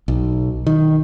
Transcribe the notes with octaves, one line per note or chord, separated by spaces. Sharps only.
B1
D#3